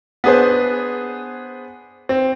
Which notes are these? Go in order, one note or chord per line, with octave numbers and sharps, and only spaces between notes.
B3 D4 G#4 B4 C5
C4